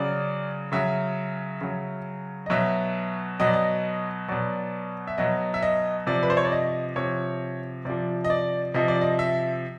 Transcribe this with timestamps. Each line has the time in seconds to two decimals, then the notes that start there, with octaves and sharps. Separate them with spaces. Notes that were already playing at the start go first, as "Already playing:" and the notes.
Already playing: C#3 F#3 D5
0.72 C#3 F#3 E5
1.61 C#3 F#3
2.46 D#5
2.50 B2 F#3 E5
3.40 B2 F#3 D#5
3.47 D5
3.53 D#5
4.28 B2 F#3 D5
5.07 E5
5.18 B2 F#3 D#5
5.54 E5
5.63 D#5
6.07 C3 F3 D5
6.23 B4
6.30 C5
6.37 C#5
6.45 D5
6.52 D#5
6.96 C3 F3 C#5
7.85 C3 F3 D5
8.24 D#5
8.30 D5
8.74 C3 F3 D#5
8.88 D5
9.01 D#5
9.19 E5